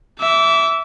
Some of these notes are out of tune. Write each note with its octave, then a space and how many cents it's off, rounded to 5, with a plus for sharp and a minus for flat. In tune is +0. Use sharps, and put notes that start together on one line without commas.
E5 +0 D6 -30